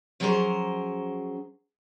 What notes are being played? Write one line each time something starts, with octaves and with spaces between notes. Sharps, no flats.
F3 F#3 C#4 G#4 A#4 C5